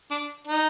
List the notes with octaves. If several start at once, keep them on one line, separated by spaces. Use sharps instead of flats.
D4
D#4